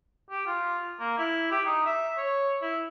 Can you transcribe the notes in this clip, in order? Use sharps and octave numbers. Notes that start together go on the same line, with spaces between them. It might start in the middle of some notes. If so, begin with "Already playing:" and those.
G4
F4
A#3
E4
G4
D#4
E5
C#5
E4